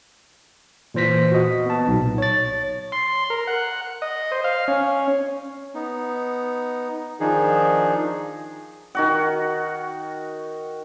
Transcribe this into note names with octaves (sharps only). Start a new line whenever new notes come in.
A#2 E3 C5 A#6 B6
F#4 D#5
B3 A5
B1 A#2 D#4
C#5 A6
C6
A#4
F#5
D#5
C5
F5
C#4
B3 D#4
D#3 F3 D4 D#4 G#4
D#3 F#4 F#5